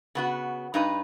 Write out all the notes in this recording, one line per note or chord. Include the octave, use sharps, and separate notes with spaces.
C#3 B3 F#4
G2 D#4 B4